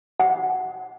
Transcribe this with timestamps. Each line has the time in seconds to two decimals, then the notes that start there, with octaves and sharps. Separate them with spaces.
0.20 F#5